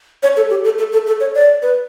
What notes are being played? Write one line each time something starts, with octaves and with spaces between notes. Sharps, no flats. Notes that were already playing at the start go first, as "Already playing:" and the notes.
C#5
A4
G4
A4
A4
A4
A4
C#5
D5
B4